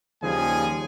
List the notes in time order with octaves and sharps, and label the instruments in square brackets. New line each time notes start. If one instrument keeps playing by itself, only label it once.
[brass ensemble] D#2 C#3 F3 G3 G#4 G#5